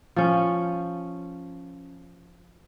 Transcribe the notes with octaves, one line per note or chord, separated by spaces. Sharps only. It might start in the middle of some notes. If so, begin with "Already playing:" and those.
F3 C#4